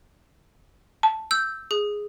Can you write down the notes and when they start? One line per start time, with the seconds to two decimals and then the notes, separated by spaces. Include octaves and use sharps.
1.03 A5
1.31 E6 G6
1.71 G#4